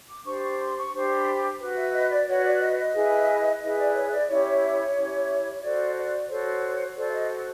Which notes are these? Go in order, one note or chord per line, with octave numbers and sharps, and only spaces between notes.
D6
D4 G4 C5 C#6
C#6
C6
C#6
D4 G4 C5
B5
F#4 B4
E5
D#5
D5
F#4 B4 C#5
D5
D#5
D#5
E4 G#4 B4
E4 G#4 B4 D#5
D5
C#5
D5
C#4 E4 G4 C#5
C#4 E4 G4
C#5
F#4 A4 C5 D5
D#5
D5
F#4 A4 C5 C#5
F#4 A4 C5 D5
E5
D#5